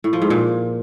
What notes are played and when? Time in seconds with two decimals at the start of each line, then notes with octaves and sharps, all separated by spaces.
0.04 A2
0.13 F3
0.22 G#2
0.30 A#2